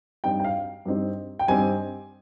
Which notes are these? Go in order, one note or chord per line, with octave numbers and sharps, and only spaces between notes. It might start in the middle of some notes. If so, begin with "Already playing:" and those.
G2 G3 C4 D#4 G5
G5
F5
G2 G3 C4 D#4
G5
G2 G3 C4 D#4 G#5